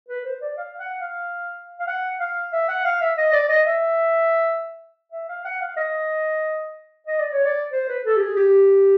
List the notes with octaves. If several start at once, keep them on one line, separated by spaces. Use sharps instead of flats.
B4
C5
D5
F5
F#5
F5
F5
F#5
F5
E5
F#5
F5
E5
D#5
D5
D#5
E5
E5
F5
F#5
F5
D#5
D#5
D5
C#5
D5
C5
B4
A4
G4
G#4
G4